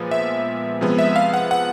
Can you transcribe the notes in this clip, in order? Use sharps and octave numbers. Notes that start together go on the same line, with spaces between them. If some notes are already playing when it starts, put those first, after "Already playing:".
Already playing: A#2 F3 G#3 B3
E5
C3 F3 G#3 B3
E5
F5
F#5
F#5